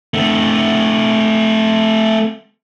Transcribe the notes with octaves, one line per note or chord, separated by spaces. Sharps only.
A3 C4